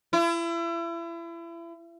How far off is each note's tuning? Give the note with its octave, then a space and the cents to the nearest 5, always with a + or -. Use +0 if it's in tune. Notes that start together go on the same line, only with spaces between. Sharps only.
E4 +35